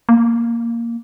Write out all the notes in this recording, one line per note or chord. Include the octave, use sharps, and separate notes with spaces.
A#3